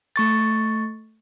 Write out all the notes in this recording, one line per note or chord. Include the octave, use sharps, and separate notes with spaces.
A3 C#6 A6